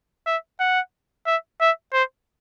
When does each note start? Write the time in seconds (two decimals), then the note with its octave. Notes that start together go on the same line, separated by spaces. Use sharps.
0.27 E5
0.60 F#5
1.26 E5
1.61 E5
1.93 C5